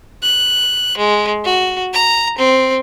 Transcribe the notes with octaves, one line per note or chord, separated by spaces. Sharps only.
F#6
G#3
F#4
A#5
C4